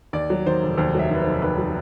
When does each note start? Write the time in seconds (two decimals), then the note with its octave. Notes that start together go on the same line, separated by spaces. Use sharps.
0.13 D#2 D5
0.30 F#3
0.46 D#3 C5
0.63 F1
0.77 D#2 C5
0.95 F#3 E5
1.10 D#3 B4
1.21 F1 C5
1.42 D#2 B4
1.58 F#3